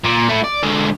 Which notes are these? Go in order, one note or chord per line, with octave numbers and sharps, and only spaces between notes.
A#2
A3 E4
D5
D3 G#3